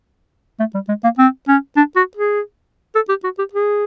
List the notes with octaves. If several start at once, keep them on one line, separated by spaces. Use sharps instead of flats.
A3
G3
G#3
A#3
C4
C#4
D4
F#4
G#4
A4
G4
F#4
G4
G#4